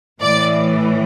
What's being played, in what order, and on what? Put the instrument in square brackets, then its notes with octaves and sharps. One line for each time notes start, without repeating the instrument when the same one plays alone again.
[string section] A2 E3 D5